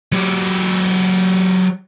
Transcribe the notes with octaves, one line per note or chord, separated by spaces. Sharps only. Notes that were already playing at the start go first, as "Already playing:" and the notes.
F#3 G4